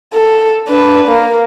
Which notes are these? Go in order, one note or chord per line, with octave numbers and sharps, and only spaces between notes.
A4
D4 B4
A#3